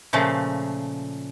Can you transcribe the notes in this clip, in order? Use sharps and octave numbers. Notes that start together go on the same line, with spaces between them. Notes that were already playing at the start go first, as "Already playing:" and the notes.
A#2 C#3 F3 A3